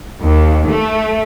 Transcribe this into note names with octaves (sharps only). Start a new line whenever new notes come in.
D#2
A3